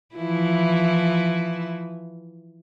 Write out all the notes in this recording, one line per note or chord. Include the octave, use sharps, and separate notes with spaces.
E3 F3 E4